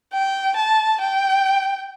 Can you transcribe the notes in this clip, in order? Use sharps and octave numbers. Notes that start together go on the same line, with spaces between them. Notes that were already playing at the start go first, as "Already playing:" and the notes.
G5
A5
G5